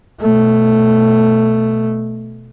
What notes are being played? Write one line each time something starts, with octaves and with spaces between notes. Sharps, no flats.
B2 A3